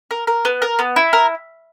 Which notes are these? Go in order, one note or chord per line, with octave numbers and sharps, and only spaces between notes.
A#4
A#4
B3
A#4
B3
E4
A#4